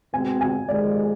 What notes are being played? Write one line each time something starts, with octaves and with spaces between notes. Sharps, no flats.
B2 G#3 C4 G#5
G#5
F2 C3 D#3 G#3 D5